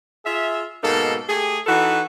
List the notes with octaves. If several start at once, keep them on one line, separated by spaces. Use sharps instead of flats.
F4 G#4 E5
G#2 B2 A#3 D#4 A4
A3 G4 G#4
E3 D#4 F#4 A4 B4